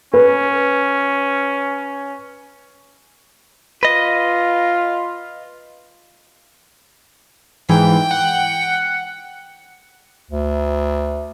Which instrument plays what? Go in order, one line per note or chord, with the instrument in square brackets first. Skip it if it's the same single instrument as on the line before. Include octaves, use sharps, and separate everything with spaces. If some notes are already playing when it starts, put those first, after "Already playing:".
[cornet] C#4 [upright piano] B4
[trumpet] F4 [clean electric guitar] B4 D#5
[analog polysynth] G#2 E3 [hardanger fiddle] G5
[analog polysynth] F#5
[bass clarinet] D2